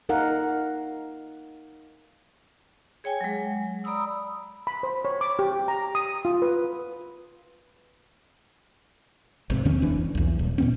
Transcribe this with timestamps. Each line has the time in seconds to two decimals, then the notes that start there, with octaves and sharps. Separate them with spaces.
0.09 D#4 A#4 F5 F#5
3.04 G#4 C#5 G5 G#5
3.21 F#3 G#3
3.84 D5 A#5 B5 D#6 E6
4.67 B5
4.83 C5
5.05 C#5
5.21 D6
5.39 G4
5.68 A#5
5.95 D#6
6.25 F4
6.42 B4
9.50 G#1 C3
9.65 D#2 D#3 C4 C#4
9.82 F1 E3 D4
10.15 B1 E2
10.39 D#1
10.58 A#2 B3 C#4